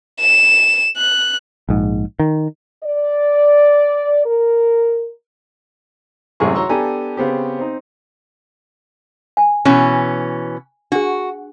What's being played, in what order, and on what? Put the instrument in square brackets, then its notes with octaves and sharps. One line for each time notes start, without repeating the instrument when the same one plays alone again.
[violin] E7
F#6
[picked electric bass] A#1 G#2
D#3
[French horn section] D5
A#4
[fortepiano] A1 F#2 C3 G#3 G#4 C#6
F#4 C#5 A#5 C6 C#6 E6
B3 D4 G4 A4 G#5 A#5
C#3 B3 C4 G4
C4 D#4
[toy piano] G#5
[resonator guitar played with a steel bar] B2 E3 C#4
[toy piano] D4 G#4 [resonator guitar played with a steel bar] F#4